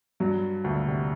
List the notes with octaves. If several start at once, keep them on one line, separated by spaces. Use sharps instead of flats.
G2 F#3
D2 A#2
C3